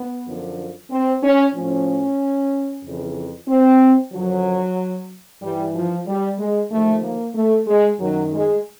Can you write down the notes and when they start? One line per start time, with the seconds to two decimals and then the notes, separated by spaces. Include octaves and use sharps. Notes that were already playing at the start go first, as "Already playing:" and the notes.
Already playing: B3
0.26 F#2 D3 F3
0.90 C4
1.23 C#4
1.55 A2 F3 C#4
2.84 F2 C#3 E3
3.48 C4
4.13 F#2 D3 F3 F#3
5.42 G2 E3 G3
5.75 F3
6.07 G3
6.38 G#3
6.71 D#2 D3 F3 A3
7.04 A#3
7.35 A3
7.67 G#3
7.99 F#2 D#3 F#3
8.32 G#3